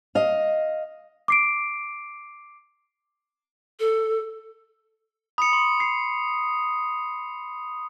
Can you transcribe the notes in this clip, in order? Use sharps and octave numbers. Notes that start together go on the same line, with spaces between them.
D#5 F5
D6 C7 D7
A4
B5 D#6 C#7
C6
C7